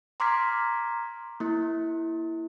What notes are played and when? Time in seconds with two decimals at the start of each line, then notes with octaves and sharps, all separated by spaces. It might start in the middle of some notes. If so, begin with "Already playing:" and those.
0.20 A#5 C6 D6 F6 G#6 B6
1.40 A#3 E4